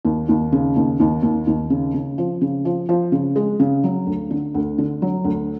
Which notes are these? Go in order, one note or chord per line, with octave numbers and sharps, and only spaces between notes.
D#2
D#2
C#3
D#2
D#2
D#2
D#2
C#3
C#3
F3
C#3
F3
F3
C#3
G#3
C#3
F#3
D2
D3
D2
D3
F#3
D2